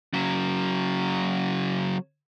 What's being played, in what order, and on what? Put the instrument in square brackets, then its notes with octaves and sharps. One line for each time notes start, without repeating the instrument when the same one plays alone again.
[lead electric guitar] C#3 F#3